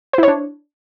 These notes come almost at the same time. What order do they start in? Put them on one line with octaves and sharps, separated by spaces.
C5 E4 C#5 D4